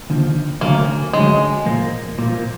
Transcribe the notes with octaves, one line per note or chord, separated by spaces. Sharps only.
D#2 D3 F3
D2 D3 F#3 A3 A#3 C#4
D2 D3 F#3 G#3 A3 C#4
A#2 F3 A#3
A#2 F3 A#3